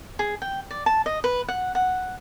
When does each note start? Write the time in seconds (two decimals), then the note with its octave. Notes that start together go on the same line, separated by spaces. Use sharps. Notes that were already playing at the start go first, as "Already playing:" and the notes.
0.19 G#4
0.42 G5
0.71 D5
0.86 A5
1.06 D#5
1.24 B4
1.48 F#5
1.75 F#5